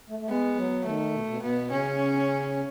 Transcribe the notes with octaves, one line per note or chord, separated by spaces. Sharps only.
A3
A3
G#3 B3
F#3
D#3 A3
B2
B2
B2 B3
C#3 C#4